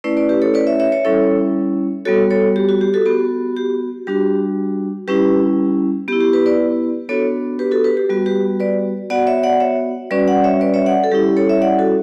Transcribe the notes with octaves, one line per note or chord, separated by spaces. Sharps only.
A3 C#4 E4 B4 D5
B4 D5
G4 B4
A4 C#5
B4 D5
C#5 E5
C#5 E5
C#5 E5
G3 C#4 E4 A4 C#5
G3 B3 F#4 A4 C#5
A4 C#5
G4
F#4
G4
F#4 A4
B3 F#4 G4
G4
G3 D4 F#4 G4
G3 C#4 E4 G4 B4
B3 E4 G4
G4
G4 B4
B4 D5
B3 D4 F#4 A4 C#5
G4 B4
F#4 A4
G4 B4
G4
G3 B3 F#4
G4 B4
B4 D5
B3 F#4 D5 F#5
C#5 E5
D5 F#5
C#5 E5
G3 C#4 F#4 B4 D5
D5 F#5
C#5 E5
B4 D5
C#5 E5
D5 F#5
A4
G3 C#4 E4 G4
G4
A4 C#5
C#5 E5
D5 F#5
F#4 A4